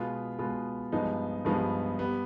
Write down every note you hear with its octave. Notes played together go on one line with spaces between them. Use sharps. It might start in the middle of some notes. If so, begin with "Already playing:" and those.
Already playing: B2 G#3 B3 F4
B2 G#3 B3 F4
G2 F3 G#3 B3 D#4
G2 F3 G#3 B3 D#4
G3 B3